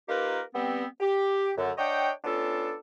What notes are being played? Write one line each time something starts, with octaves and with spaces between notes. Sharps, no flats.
A#3 D#4 F4 G4 A#4 B4
G3 B3 C4
G4
F#2 D3
D4 C#5 D#5 F#5 G5
B3 C#4 D4 F4 A4